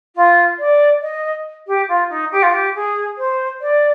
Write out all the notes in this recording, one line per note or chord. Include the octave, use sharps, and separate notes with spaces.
F4
D5
D#5
G4
F4
D#4
G4
F4
G4
G#4
C5
D5